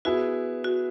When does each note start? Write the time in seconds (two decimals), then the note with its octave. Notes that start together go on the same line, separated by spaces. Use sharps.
0.05 B3 E4 F#4 G#4
0.64 F#4